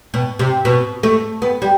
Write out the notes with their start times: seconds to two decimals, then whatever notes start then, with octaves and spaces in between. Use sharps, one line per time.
0.14 B2
0.39 C3
0.65 B2
1.03 A3
1.42 B3
1.62 G3